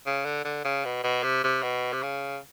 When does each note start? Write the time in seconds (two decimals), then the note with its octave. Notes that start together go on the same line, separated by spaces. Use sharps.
0.06 C#3
0.25 D3
0.44 D3
0.65 C#3
0.85 B2
1.04 B2
1.23 C3
1.44 C3
1.63 B2
1.93 C3
2.02 C#3